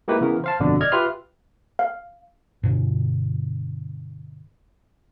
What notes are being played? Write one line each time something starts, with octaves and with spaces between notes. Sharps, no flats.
G#3 A#3 D#4 E4 G4 B4
C#3 E3 B3 A#4
C5 F5 A5
G1 F2 B2 D3 D4 D6
D5 D#5 F6 G#6
F4 G4 B4 E5 C6 F6
F5
G2 B2 D3